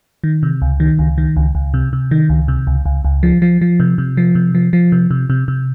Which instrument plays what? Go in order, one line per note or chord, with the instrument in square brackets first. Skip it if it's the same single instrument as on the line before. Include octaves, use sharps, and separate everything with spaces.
[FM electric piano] D#3
C3
C#2
D#3
C#2
D#3
C#2
C#2
C3
C3
D#3
C#2
C3
C#2
C#2
C#2
F3
F3
F3
C3
C3
F3
C3
F3
F3
C3
C3
C3
C3